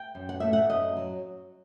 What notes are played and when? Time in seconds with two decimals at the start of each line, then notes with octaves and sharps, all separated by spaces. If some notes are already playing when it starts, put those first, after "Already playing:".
Already playing: G5
0.15 F#2
0.29 F#5
0.40 A3 E5
0.53 F#5
0.69 F#2 D#5
0.97 F#3